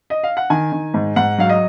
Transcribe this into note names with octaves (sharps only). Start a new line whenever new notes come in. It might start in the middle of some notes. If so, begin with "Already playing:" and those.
D#5
F5
F#5
D#3 G#5
D#3
G#2
G#2 F#5
F#3 F5
D#5